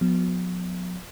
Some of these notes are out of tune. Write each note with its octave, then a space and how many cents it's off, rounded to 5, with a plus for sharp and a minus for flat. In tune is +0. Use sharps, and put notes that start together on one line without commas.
F#3 -45 B3 +0